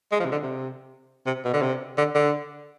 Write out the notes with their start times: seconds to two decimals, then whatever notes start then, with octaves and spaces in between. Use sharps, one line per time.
0.12 G#3
0.20 F3
0.25 C3
0.32 D3
0.43 C3
1.26 C3
1.45 B2
1.53 D3
1.62 C3
1.98 D3
2.15 D3